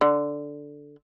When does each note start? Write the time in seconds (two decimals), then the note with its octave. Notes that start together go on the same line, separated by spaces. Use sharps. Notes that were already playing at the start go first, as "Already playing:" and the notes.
0.01 D3